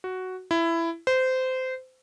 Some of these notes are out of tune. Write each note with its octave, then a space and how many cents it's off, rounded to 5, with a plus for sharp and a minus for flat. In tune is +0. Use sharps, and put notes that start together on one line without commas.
F#4 +5
E4 +15
C5 -20